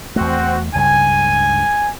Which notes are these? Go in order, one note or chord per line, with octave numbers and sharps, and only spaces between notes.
E2 A3 C4 F#4
C#2 G2 C#3 G#5